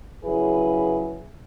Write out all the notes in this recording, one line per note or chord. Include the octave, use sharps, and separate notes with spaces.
C#3 F#3 E4 G#4 B4